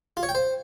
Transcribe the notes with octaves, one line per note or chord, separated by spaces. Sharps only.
F4
C#5
G5
C5